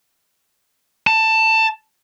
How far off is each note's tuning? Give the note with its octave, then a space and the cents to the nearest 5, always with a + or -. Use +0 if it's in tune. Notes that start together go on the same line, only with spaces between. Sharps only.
A5 +15